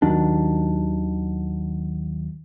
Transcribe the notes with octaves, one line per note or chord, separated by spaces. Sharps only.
D#2 D#3 F#3 D4